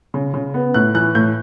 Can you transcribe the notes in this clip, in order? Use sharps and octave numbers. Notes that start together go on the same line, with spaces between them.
C#3
C#3
B3
A2 F#6
E3 F#6
A2 G6